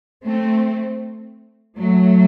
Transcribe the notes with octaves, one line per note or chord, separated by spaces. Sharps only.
A3 C4
F#3 A3